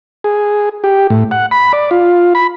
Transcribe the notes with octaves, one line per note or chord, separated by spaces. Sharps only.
G#4
G4
A2
F#5
B5
D5
F4
B5